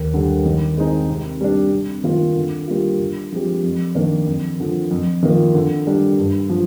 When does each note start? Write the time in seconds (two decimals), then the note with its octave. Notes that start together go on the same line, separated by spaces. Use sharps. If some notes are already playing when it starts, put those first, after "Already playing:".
Already playing: D#2
0.14 D3 G3
0.46 D#3
0.77 G#3 C4 D#4 G#4
1.09 C3
1.41 G3 D4
1.72 C3
2.04 D#3 A#3 F4 A#4
2.36 D3
2.68 G3 A#3 F4
3.00 D3
3.32 F3 G#3 C4 G4
3.63 F2
3.95 D#3 A#3 D4
4.27 F2
4.60 D3 F3
4.91 F2
5.23 D#3 A#3 F4
5.54 D3
5.87 G3 D4
6.19 G2
6.50 F3